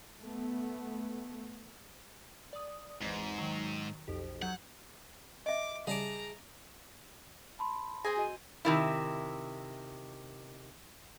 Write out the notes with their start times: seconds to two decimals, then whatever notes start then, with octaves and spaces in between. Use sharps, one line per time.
0.21 A3 B3
2.53 D5 D#6
3.02 G#1 E2 G#2 E3
3.38 D#3 F#3
4.08 B1 F2 G4
4.42 F#3 F#5 G6 G#6
5.46 D#5 E5 D6
5.87 C#3 G3 G#4 A5 A#5 D6
7.59 A5 B5 C6
8.04 C4 G#4 G#5 A#6
8.17 F#4 D#5 D#7
8.65 C3 D#3 E4